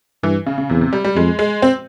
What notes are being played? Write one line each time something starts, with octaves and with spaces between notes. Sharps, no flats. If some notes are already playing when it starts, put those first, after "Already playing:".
G2 E3
C#3
C#3
E2 C3
C3
G3
G3
F2 G#3
G#3
C4